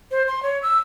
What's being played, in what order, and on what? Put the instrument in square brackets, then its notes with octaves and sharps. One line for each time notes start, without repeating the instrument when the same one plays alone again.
[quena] C5
C6
C#5
E6